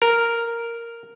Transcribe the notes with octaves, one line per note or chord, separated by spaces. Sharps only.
A#4